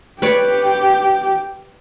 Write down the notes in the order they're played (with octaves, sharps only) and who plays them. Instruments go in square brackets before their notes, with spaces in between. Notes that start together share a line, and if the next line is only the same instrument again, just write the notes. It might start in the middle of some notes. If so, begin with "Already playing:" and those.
[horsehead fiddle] G4 [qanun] B4 C#5 D5